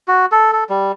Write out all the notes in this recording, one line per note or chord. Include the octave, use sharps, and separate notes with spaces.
F#4
A4
A4
G3